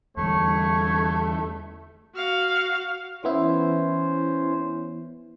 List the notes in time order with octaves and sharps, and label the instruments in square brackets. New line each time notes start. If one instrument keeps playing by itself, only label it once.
[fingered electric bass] E2 D3 G3 [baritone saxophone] A3 [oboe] C#5
[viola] F#4 F5
[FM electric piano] E3 B3 E4 [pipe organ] C#4 C5